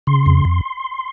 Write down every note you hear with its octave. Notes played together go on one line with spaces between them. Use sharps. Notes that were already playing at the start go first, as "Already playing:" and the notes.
C#3 C6
F2
F2